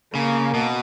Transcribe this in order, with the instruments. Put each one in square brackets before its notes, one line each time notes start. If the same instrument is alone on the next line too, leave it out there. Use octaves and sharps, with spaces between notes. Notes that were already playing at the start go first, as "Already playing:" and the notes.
[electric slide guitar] C#3 [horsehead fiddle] A#3
[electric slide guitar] B2